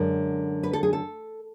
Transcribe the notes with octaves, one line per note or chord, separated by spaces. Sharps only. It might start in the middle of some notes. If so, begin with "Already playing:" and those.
Already playing: F#2 D3 G#3
B4
A4
G#4
A4